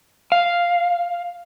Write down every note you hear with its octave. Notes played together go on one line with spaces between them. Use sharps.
F5